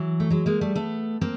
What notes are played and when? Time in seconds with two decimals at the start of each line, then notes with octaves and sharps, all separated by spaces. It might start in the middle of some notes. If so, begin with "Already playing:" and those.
Already playing: E3 F#3
0.20 A3
0.30 F#3 G#3
0.46 G#3 A#3
0.61 G3 A3
0.75 A3 B3
1.21 A#3 C4